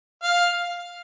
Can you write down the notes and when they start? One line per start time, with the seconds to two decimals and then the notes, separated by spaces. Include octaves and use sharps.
0.23 F5